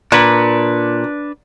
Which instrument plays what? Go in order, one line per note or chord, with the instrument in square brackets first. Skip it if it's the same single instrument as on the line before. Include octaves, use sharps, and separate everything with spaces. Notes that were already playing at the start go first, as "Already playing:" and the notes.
[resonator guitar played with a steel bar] A#2 [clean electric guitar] D4 B4